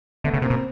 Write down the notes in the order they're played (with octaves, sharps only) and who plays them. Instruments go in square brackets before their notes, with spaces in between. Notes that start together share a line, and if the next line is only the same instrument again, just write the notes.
[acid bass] D3 [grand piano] A3 B3
[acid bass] C#3
[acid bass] C3 [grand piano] A#3 C4
[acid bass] B2
[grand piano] C4